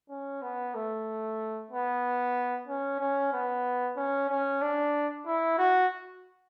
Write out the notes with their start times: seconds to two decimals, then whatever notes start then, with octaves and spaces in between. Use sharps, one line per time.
0.10 C#4
0.42 B3
0.75 A3
1.71 B3
2.68 C#4
3.00 C#4
3.33 B3
3.97 C#4
4.29 C#4
4.62 D4
5.26 E4
5.58 F#4